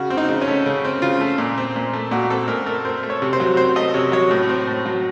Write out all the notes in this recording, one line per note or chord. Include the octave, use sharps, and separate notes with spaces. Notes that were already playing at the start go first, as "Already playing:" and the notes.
Already playing: C#3 F#4
C4
D#4
C#3
C#4
A3
C#3
C4
C#3 F4
A3
A#2
C4
A#2
A3
A#2 F#4
C4 A4
A#2 A#4
A3 A#4
C4 C5
A3
C#5
C3
C5
F#3
C4 C5
A3 D#5
C3 C#5
F#3 C#5
A2
C4
A2
F#3